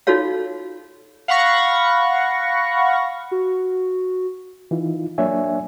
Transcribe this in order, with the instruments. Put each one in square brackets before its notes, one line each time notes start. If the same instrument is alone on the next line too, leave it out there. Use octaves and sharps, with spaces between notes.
[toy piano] D#4 F4 F#4 A4 C#5 F5
[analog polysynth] F5 F#5 B5 C#6 A#6
[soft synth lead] F#4
[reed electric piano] E3 D#4 F4
F#3 A#3 D4 C#5 E5 G#5